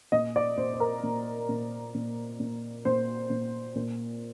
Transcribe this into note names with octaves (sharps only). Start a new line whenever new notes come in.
A#2 D#5
D5
A#2 C5
C5
A#4
A#2
A#2
A#2
A#2
A#2 C5
A#2
A#2